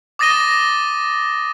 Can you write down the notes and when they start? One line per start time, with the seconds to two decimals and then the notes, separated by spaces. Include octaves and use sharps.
0.19 D6 D#6 A6 A#6 D#7 G7